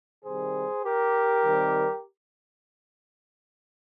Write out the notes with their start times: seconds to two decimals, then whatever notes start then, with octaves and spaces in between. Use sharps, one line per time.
0.25 C3 D#3 G3 C4 G#4 C5
0.85 G4 A#4
1.44 C3 D#3 G3 C4